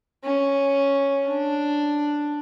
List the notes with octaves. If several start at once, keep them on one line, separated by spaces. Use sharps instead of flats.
C#4
D4